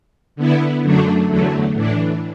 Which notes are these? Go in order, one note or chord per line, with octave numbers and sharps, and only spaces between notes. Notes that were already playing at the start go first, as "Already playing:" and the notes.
D3 B3 E4
F#2 D3 F#3 A3 D4
E2 D3 F#3 A3
A2 E3 D4